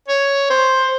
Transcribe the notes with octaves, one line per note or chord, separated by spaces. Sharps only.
C#5
C5